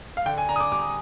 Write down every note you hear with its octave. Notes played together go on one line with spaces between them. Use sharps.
F5
D3 G5
G#5
D4 A#5
D#6
D6
G3 D6